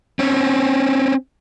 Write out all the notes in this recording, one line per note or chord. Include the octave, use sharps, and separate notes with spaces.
C4 C#4